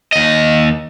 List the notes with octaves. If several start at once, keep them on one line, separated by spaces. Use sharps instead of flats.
D#2 D#5